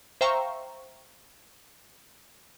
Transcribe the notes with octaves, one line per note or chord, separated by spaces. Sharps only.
C5 E5 F5 G5 A#5 C#6